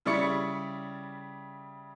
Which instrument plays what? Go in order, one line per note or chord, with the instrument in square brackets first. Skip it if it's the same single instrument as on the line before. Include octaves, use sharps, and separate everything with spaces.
[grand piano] C#3 G3 E4 D5 C#6 C#7